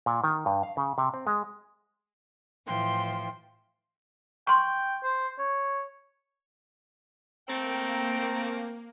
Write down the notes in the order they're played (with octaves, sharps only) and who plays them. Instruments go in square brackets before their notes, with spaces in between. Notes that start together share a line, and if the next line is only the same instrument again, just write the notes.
[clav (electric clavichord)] A#2
D#3
G2
F5
C#3
C3
C4
G#3
[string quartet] A2 E3 F3 G5 C6
[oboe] G5 [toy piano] C6 C#6
[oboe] C5
C#5
[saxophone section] A3 C4 [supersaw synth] A#3 [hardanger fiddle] G5 [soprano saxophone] A#5